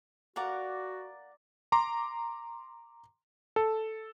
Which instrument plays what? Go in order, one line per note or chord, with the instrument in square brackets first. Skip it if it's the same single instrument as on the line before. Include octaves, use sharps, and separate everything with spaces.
[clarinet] F#4 [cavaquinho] A#4 F5 F#5 [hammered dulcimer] D5 A#5
[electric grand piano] A#5 C6 D6
A4